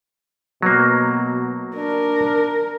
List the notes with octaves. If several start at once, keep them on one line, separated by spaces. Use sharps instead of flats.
B2 F#3 A#3
D4 A#4